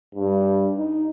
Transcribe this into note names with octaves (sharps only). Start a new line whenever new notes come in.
G2
D#4